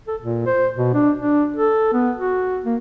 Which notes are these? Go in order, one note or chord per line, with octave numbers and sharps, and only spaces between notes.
A4
A#2
C5
B2
D4
D4
A4
B3
F#4
A#3